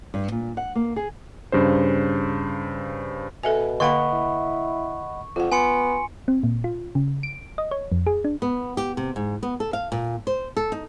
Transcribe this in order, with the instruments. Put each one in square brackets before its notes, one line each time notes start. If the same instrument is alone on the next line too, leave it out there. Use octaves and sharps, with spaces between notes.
[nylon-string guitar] G2
A#2
F#5
A#3
G#4
[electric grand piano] G2 C#3 C5
[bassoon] B2 [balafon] A4 E5 G#5
[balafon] D3 A#3 F5 [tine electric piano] D#5 F#5 B5 [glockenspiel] C#6
[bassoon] E4
[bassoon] F2 [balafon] F4 F#5
[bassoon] B3 [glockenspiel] G#5 C6 C#7
[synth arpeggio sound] C4
A#2
F4
C#3
D7
D#5
C#5
F2
G#4
D4
[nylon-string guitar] B3
G4
C3
G#2
B3
A4
F5
A#2
C5
A4
D#4